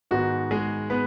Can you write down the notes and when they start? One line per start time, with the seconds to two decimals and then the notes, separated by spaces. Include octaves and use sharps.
0.11 G#2 D#3 G#3 B3 D#4 F#4
0.51 G#3 G#4
0.90 B3 B4